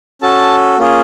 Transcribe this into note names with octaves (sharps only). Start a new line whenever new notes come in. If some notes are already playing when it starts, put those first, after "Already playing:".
C#4 F#4 A4 A5
A#3 C#4 F4 G#4